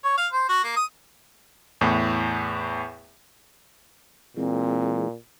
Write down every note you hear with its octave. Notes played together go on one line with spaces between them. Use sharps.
C#5
F5
C5
F#4
A#3
D#6
E2 A2
A#2 E3 G#3 C4